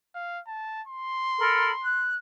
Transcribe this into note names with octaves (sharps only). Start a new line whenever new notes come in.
F5
A5
C6
A4 A#4 B5
F#6